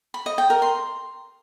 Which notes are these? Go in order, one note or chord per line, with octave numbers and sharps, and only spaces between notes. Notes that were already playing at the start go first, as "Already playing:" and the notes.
B5
D#5
G5
A#4
C6